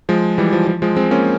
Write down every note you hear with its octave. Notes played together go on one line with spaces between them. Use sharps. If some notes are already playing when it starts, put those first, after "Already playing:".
F3 G#3
E3 G3
F3
F3
F3 G#3
G#3 C4
A#3 C#4